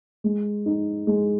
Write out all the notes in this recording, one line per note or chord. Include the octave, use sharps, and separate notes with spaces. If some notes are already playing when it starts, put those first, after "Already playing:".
G#3
D#4
G#3